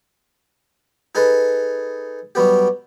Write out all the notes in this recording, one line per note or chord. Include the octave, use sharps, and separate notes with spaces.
D#4 G#4 A4 B4
F#3 G3 B3 G4